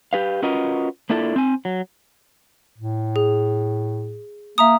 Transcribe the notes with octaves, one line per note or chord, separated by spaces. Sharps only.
G4 B4 F5
C#4 F4 F#4 A#4 B4 D#5
A#3 D4 E4 F4 A4
C4 G#5
F#3
A2
G#4
A#3 E5 A#5 D#6